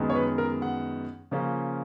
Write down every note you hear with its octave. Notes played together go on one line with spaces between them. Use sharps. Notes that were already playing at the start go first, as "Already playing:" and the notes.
Already playing: F#2 D#3 G#3 B3
C#5
B4
A#4
F#5
C#3 F3 A#3 C#4